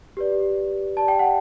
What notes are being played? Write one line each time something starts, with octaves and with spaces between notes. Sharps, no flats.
G4 B4 D5
G4 D5 A5
G5
F#5